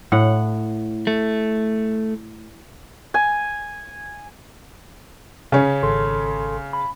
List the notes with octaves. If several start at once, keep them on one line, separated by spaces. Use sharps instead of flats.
A2 F#5
A3
G#5
C#3 C#4
G#1 A4 C6
B5